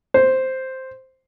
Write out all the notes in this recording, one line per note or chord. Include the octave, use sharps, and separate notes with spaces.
C5